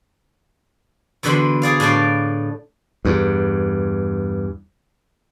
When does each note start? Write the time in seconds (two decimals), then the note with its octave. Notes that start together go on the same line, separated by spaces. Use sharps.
1.23 E2 B2 D3 B4 B5 C6
1.62 G#4 D5 F5
1.80 A2 D4 D5 F5
3.05 E2 G2